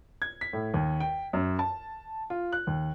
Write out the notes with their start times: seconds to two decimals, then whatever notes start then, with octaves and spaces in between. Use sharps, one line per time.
0.22 G#6
0.41 B6
0.53 A2
0.74 D#2
1.00 G5
1.33 F#2
1.59 A5
2.30 F4
2.53 F#6
2.67 D#2